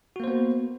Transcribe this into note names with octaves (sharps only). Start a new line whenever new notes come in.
A#3 B3 F#4 C5